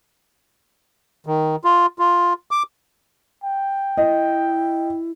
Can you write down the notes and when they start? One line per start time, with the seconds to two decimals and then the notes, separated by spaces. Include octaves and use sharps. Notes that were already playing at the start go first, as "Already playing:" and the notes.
1.26 D#3
1.64 F4
1.99 F4
2.51 D6
3.44 G5
3.97 E4 D#5